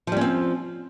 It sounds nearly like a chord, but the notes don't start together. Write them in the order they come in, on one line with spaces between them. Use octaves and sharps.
F3 G3 C#4 C4